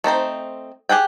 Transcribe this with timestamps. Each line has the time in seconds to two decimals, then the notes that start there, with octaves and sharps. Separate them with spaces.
0.04 A3 C4 D#4 C5
0.89 G4 G#4 F#5 G5